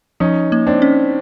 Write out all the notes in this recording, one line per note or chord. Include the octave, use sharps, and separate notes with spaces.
F3 C#4 D#4
A#3
C4 D4
C#4